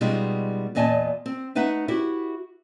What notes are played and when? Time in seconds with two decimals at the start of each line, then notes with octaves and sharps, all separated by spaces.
0.01 B2 G3 G#3 D#4 F4
0.75 E2 A#2 D#5 G#5 A5
1.26 C4
1.55 A3 D#4 B4 E5 F#5
1.88 E4 F#4 G4